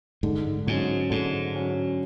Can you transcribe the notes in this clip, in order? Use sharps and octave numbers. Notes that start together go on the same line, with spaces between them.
G#2 D3
G#2 F#3 C#4
G#2 D3
F#3 C#4